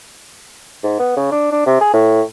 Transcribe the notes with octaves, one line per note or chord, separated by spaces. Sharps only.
G#2
B3
C#3
D4
D4
C3
G#4
A2